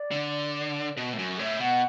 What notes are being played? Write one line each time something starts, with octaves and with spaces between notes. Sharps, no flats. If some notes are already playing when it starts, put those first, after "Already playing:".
Already playing: D5
D3
B2 F#4
A2
F#2 F#4
A2 E5
B2 F#5